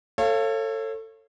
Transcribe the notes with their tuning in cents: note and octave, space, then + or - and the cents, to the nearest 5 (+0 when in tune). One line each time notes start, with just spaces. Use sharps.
A4 +20 C#5 -25 F5 -20